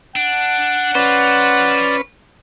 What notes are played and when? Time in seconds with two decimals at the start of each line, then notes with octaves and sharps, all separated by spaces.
0.16 D4 F#5
0.95 C#4 F4 B4 C5 D5